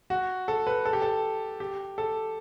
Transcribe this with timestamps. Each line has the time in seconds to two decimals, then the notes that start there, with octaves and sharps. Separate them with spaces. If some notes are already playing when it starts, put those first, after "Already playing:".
0.10 F#4
0.48 A4
0.67 B4
0.85 A4
0.93 G4
1.02 A4
1.60 G4
1.98 A4